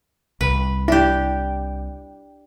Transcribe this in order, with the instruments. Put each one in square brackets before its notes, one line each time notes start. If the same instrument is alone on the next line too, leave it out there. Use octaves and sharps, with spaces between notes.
[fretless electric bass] C2 [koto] B4
[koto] D4 G4 [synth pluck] E4